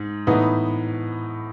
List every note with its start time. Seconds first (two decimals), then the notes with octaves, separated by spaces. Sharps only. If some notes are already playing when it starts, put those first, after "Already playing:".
Already playing: G#2
0.27 A2 E3 B3 D#4